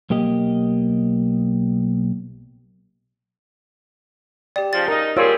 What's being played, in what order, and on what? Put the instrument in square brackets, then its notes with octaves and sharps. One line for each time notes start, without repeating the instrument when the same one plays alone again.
[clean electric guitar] B1 A#3 G4 D#5
[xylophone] G4 D5 [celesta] G5
[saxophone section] C#3 F3 [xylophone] A6
[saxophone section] D#4 [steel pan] A#4 D#5
[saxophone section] G3 G#4 [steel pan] F4 C5 C#5 [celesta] A#4 F5 E6